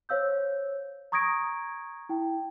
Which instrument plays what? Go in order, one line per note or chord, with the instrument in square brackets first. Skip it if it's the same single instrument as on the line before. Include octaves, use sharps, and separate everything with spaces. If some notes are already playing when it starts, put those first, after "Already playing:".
[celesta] C5 C#5 F5 E6 G6
A#5 C#6 D#6 G#6 A#6 D7
E4 G5